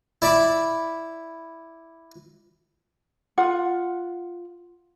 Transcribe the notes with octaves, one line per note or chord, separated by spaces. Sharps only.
E4 D5 E5 B5 D6
F4 F#5